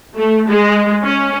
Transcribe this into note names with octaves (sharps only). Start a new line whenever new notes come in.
A3
G#3
C#4